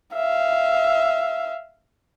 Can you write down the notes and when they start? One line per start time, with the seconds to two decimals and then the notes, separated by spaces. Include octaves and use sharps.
0.14 E5 F5